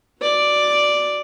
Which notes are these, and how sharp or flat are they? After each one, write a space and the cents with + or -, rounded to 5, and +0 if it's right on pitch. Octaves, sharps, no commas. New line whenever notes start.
F#4 +0 D5 +0